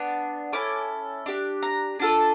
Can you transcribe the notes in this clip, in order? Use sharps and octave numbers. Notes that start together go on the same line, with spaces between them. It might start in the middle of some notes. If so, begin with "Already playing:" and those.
Already playing: B3 D4
C#4 E4 A4 D6
D4 G4
A#5
D4 F4 A4